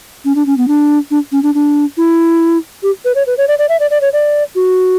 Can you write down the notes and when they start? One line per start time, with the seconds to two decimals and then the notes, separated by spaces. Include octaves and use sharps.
0.25 C#4
0.35 D4
0.46 C#4
0.58 B3
0.68 D4
1.11 D4
1.32 C#4
1.43 D4
1.55 D4
1.97 E4
2.83 G4
3.05 B4
3.15 C#5
3.27 B4
3.38 C#5
3.48 D5
3.59 D5
3.69 E5
3.80 D5
3.91 D5
4.01 C#5
4.13 D5
4.55 F#4